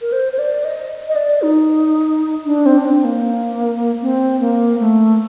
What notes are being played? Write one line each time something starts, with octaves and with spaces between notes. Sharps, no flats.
A#4
C5
C5
D5
D#5
D#5
D5
D#4
D4
C4
D4
C4
A#3
C4
A#3
A3